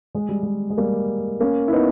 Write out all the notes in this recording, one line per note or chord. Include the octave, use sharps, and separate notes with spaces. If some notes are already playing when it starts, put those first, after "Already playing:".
G#3
G3
G#3
G#3
G3 A#3
A#3 C#4
E4
B3 D#4